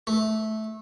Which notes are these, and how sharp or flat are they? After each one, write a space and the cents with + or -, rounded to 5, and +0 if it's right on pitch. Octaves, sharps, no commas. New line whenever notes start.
A3 -15